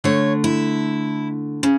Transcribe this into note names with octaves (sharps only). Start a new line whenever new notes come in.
D3 A3 C#5
E4
C#3